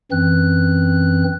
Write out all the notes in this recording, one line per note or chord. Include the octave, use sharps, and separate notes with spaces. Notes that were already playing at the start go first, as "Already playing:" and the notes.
F#2 E3 C4 F#6